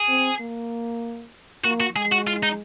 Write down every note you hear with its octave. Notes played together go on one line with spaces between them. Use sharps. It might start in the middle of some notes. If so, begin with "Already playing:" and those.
Already playing: G#4
C4
A#3
A#3 F#4
F#4
G#3 G#4
F#4
F4
D#4